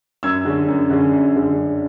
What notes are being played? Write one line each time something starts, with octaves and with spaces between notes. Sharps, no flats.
F#2 E6 G#6
D3 G#3 C#4
F#2
D3 G#3 C#4
F#2
D3 G#3 C#4
F#2